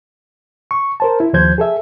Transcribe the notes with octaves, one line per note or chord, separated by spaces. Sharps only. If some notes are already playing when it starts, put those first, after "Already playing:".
C#6
A#4 C5 A5
E4
D#2 F3 C5 G6 G#6
G#4 A4 E5